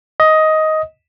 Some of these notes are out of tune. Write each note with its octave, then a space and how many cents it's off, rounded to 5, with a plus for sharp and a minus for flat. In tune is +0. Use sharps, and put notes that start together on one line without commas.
D#5 +10